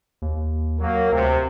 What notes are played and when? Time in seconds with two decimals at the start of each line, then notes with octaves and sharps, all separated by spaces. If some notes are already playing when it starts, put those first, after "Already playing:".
0.22 D#2
0.79 F#3 A#3
1.12 D2 C3